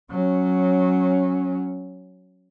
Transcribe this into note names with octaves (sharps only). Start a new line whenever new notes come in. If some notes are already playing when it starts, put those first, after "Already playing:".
F#3 C#4